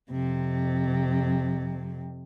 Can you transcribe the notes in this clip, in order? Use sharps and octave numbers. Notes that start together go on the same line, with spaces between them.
F2 C3